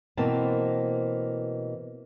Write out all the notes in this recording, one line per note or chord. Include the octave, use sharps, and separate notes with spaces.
B2 E3 A#3 C4 A5